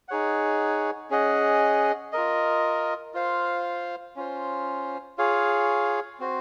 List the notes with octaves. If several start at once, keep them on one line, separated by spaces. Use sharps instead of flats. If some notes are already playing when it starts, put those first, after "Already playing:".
D#4 G#4 C#5 F#5
C#4 G#4 D#5 F#5
F4 A#4 D#5
F4 C5 F5
C#4 F4 C5
F4 G#4 C#5 F5
C4 F#4 C5